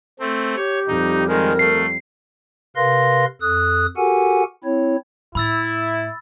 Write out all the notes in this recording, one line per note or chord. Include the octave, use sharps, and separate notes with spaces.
A3 C4
G4 C#5
F2 G3 D#4
D#3 G#3 A#4
A3 C7
C3 A#4 B4 F5 C6 A#6
F2 A4 D#6 F#6
F#4 G4 A4 A#4 F#5 G#5
C4 E4 C#5
A2 E4 B5 E6 A6